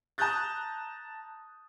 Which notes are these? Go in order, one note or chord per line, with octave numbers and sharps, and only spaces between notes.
A5 A#5 D#6 F#6 G6 A6